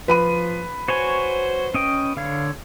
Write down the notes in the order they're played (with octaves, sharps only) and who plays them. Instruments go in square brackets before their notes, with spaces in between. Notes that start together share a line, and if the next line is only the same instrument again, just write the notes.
[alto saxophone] F3 [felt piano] B4 B5 D#7
[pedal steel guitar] F#4 C#5 G#5 [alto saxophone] C5
[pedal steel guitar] C#4 D#5 G5
[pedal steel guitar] D3 C#5 [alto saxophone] F5